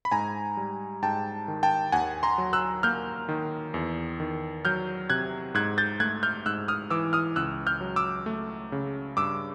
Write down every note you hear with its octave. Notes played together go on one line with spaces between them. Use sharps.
B5
G#2 G#5 A#5
G3
G#2 G5 A5
D#3
G5 A5
D#2 F#5 G#5
A#5 C6
F#3
E6 F#6
A#3 F6 G6
D#3
E2
D#3
F#3 F6 G6
C3 F#6 G#6
G#2 F#6 G#6
G6 A6
A3 F#6 G#6
F6 G6
G#2 E6 F#6
D#6 F6
E3 D6 E6
D#6 F6
C#2 E6 F#6
F6 G6
F#3
D6 E6
A3
C#3
G2 D6 E6